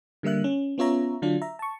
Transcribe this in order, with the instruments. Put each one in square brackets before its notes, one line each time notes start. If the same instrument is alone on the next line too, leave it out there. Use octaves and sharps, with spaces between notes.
[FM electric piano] D3 G3 A#3 E5 F#6
C#4
B3 C#4 F4 C#5 E5 A#5
D3 F#3 D4 F4
E5 A#5
A5 C#6